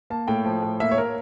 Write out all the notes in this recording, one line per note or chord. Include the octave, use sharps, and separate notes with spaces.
A#3 A5
A2 G5
F3
A2
A#3 E5
C#5
A#3 A#4